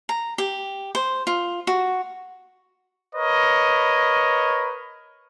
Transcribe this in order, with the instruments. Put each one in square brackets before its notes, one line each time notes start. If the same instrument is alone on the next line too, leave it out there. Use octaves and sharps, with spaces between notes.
[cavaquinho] A#5
G4
C5
F4
F#4
[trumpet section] A#4 B4 C#5 D#5